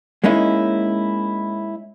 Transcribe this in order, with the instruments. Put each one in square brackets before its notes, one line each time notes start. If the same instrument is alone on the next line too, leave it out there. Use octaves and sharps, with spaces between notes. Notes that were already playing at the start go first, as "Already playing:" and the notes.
[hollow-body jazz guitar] G#3 A#3 C#4 D#4 E4